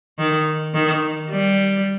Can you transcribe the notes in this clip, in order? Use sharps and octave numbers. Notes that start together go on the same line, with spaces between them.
D#3
D#3
G3